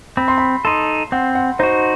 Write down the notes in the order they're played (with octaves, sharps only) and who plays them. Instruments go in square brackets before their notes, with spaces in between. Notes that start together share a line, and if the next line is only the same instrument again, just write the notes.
[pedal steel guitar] C4 [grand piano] B5
[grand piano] C6
B5
[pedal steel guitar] D#4 A4 [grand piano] C6
[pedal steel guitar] C4 [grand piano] F#5
[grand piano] F#5
[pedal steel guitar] D#4 F#4 [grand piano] C5